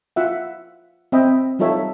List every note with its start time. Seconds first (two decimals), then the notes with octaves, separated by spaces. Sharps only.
0.16 F4 E5 F#5
1.12 C4 D#5 E5 G5 B5
1.59 G3 D#4 F4 A4 C#5 E5